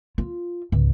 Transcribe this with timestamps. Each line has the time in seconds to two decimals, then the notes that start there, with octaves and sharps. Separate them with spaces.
0.18 F4
0.72 C#2 G#2